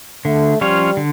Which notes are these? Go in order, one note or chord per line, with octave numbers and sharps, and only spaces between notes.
D3 A3
F3 G3 C#4 F4 C#5
D3